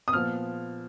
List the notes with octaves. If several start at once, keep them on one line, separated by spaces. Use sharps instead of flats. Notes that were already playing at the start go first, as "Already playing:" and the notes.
D#6
A#2 F3 B3 F6